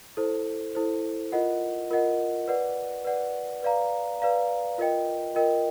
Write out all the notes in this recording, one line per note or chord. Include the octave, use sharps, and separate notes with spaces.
E4 A4 C5
E4 A4 C5
F4 A#4 D#5 F#5
F4 A#4 D#5 F#5
B4 D5 F#5
B4 D5 F#5
B4 D5 F5 A#5
B4 D5 F5 A#5
F4 A#4 D#5 G5
F4 A#4 D#5 G5